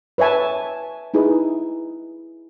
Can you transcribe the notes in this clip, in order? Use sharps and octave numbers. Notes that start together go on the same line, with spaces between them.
B4 C#5 E5 G#5 A5
D#4 E4 G#4 B4